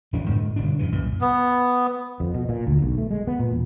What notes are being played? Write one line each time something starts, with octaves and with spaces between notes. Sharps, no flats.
A#1 F#2 E3 D4
D2 G#2
G1 B2 D4
F#2 C3 E3
C2 F#2 A#2
B3
F2
B2
A#2
D2
B1
A3
G#3
B3
A#2
E1